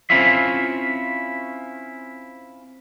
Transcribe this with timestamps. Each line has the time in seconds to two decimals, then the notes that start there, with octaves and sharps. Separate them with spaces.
0.10 C4 C#4 E4 F4 E5